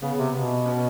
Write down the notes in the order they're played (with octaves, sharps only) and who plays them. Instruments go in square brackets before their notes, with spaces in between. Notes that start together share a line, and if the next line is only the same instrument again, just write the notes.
[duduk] C#3 [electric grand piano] B3
[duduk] C3
[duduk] B2 [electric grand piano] B3
[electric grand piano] B3 C#4